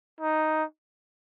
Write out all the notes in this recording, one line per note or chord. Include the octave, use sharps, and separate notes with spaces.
D#4